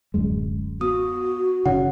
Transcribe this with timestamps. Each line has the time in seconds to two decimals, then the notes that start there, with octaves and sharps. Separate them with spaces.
0.14 D1 F#2 G#3
0.81 B3 F#4 D#6
1.66 F#1 C#3 F#5